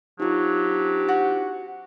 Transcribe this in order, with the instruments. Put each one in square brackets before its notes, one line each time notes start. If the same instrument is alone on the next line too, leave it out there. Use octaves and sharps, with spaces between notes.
[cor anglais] F#3 [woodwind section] C4 D4 G4 [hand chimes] D#4 F4
[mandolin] F#4